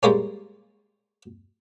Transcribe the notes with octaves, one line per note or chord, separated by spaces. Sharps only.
G3 G#3 A#3 C#4